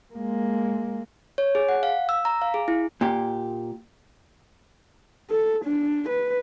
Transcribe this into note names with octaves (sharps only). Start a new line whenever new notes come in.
G#3 A#3
C#5
G#4
F#5
F5
E6
A#5
F5
G#4
E4
A#2 G4
A4
D4
B4